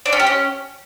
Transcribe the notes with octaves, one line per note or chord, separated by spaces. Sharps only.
D4
C#4
G4
C#4